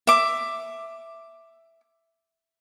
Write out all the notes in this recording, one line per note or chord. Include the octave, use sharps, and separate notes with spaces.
E5 D6